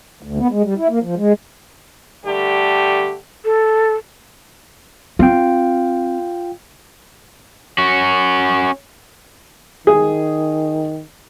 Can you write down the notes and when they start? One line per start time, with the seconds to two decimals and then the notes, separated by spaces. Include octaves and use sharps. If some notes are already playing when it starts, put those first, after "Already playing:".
0.23 D2
0.40 B3
0.52 G#3
0.64 G3
0.78 E4
0.89 A#3
1.03 F3
1.17 G#3
2.25 D3 G3 A3 G4
3.45 A4
5.19 C4 F4 F5 G5
7.78 C#4 F#4
9.87 D#3 G#4